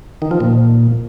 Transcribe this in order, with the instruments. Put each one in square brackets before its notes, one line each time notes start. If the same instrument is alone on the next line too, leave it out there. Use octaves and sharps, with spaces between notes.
[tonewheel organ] D#3
F3
A#2